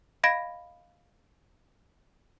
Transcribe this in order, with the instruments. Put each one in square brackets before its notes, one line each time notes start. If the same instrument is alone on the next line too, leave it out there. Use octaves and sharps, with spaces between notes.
[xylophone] D#5 F5 B5 G#6 A#6 D7